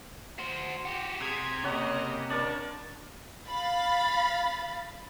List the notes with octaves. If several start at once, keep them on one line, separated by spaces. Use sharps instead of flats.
F#4 C5
F#4 G4
C3 G#4 G#6
C#3 A#3 G4 C#5 D#5 F#5
D4 A#4 C#5 D5 A5
F5 B5 A6